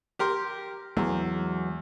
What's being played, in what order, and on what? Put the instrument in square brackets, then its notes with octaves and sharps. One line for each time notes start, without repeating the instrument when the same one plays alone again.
[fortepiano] G4 A#4 C6
[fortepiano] E2 [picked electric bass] E3 F#3 G#3